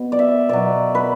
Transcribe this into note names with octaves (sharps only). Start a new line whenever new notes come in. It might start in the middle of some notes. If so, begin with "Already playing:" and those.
Already playing: B2
D5
E5
B2 F#3 D5
B4